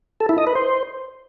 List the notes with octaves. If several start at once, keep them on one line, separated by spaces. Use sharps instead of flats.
A4
E4
D#5
B4
C5